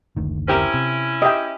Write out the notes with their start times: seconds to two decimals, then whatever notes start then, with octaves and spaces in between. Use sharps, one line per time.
0.16 F#1 D2 D#3
0.48 C4 C#4 E4 G4 A#4
0.74 C3
1.22 G4 D#5 E5 G5